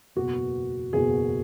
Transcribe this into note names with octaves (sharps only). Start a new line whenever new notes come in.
F#1 E2 B2 F#4
F#1 E2 B2 G#4